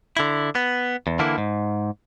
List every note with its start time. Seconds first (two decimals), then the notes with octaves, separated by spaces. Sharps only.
0.17 D3 E4
0.55 B3
1.07 E2
1.19 D3 E3 A#3 E4
1.38 G#2